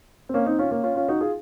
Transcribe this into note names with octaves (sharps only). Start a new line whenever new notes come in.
C4
A#3 C#4
C4 D#4
C#4 F4
A#3 C#4
C#4 F4
C#4 F4
D#4 F#4
F4 G#4